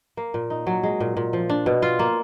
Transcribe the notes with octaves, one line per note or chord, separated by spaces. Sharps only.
A#3
A#2
D#4
F#3
G#3
A#2
A#2
F3
D4
B2
F4
A#3